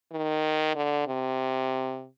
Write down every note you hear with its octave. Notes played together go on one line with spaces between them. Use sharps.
D#3
D3
C3